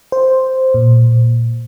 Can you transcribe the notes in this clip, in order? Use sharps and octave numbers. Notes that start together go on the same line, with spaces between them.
C5
A#2